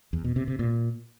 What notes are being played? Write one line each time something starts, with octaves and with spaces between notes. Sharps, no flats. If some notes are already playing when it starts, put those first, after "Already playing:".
E2
B2
C3
C3
A#2